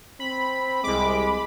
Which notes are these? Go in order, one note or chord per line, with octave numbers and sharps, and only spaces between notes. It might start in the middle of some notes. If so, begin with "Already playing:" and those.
C4 B5
C2 G#3 D6